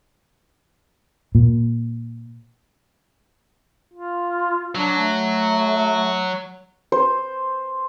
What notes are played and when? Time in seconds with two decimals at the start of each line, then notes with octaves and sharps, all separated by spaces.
1.35 A#2
3.94 F4
4.75 F#3 D4
4.98 A3
6.92 C5